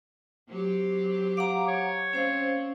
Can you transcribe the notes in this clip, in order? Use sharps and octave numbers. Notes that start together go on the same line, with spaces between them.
F#3 C4 G4
F5 F#5 A#5 D6
C#5
C4 C#4 C5 F5